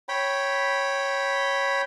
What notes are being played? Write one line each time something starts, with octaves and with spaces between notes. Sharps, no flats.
C#5 G5 B5